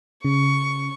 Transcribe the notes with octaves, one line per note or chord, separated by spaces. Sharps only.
C#3 C#6